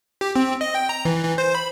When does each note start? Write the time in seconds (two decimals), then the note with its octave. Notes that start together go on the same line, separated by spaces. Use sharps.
0.21 G4
0.35 C4
0.61 D#5
0.75 G5
0.89 A#5
1.05 E3
1.24 E3
1.38 C5
1.55 B5